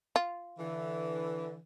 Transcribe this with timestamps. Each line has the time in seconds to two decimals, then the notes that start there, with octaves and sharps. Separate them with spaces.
0.16 F4
0.59 D3 E3